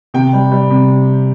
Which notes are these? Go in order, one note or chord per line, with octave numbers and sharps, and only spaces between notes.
C3 G5
G3
G3
C3